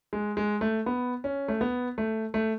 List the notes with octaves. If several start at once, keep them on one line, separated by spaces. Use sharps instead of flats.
G#3
G#3
A3
B3
C#4
A3
B3
A3
A3